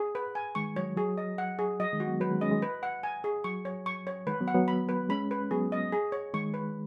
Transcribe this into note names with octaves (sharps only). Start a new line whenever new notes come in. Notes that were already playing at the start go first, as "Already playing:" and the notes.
Already playing: G#4
B4
G#5
D#3 G#3 C#6
F#3 C#5
F#3 G#4
D#5
F#5
G#4
F#3 D#5
D#3 G#3
F#4
F#3 B3
F#3 B4
D#3 G#3
G#3 C#4 D#5
D#3 G#3
B4
F#5
G#5
G#4
F#3 C#6
C#5
C#6
C#5
D#3 G#3 B4
F#3 B3
F#5
F#3 B3
B5
B4
G#3 C#4 B5
B4
F#3 B3 G#4
D#5
G#4
C#5
D#3 G#3 C#6
B4